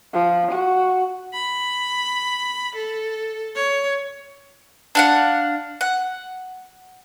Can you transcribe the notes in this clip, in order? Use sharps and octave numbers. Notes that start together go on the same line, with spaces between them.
F3
F#4
B5
A4
C#5
D4 F5 F#5
F#5